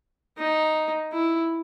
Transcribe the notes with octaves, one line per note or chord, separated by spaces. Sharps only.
D#4
E4